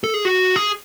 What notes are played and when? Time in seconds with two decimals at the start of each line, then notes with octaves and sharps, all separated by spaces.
0.04 A4
0.14 G#4
0.25 F#4
0.56 G#4